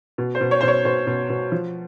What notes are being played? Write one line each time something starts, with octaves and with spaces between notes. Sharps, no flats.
B2
C5
B2
C#5
B2 C5
C#5
B2 C5
B2
B2
F3